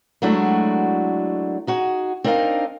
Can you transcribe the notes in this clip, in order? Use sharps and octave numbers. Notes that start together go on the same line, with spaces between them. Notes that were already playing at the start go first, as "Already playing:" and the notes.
F#3 G#3 A3 D4 E4 F#4
D#4 F#4 G#4
C4 D4 D#4 A#4 D#5 F5